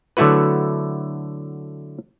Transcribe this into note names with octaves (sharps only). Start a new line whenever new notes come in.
D3 F#3 A3 E4 F#4 B4